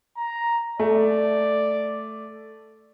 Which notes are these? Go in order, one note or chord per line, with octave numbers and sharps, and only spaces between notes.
A#5
A3 D5